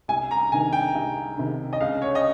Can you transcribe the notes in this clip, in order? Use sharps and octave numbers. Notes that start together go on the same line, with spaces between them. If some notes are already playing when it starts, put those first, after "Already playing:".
C2 G#5
A#5
C3 D#3 G#5
G5
C2
C3 D#3
D#5
C#2 F5
C#5
D#5